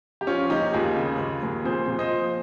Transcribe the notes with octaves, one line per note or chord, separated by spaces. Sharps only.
G4
F3 C#4 F4
D#2 D#4 G4
D#2 F4 G#4
C#3
D#2
D#2
A#2 G#4 C5
A#2
C5 D#5
F3